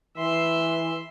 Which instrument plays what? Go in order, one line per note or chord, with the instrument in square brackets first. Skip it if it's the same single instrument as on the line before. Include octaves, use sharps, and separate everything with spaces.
[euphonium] E3 [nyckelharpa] E5 C6